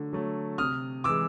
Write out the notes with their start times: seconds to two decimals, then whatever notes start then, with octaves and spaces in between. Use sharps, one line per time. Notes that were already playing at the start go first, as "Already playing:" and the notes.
Already playing: D3 F#3 A3
0.13 F#3 A3
0.58 C3 D#6 F6
1.04 E3 G#3 D6 E6